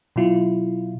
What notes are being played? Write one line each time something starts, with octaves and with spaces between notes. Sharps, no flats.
B2 F#3 E4 F4